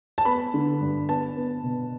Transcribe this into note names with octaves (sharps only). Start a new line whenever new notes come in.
A5
B3 B5
D3
G2
B3 A5
B3
B2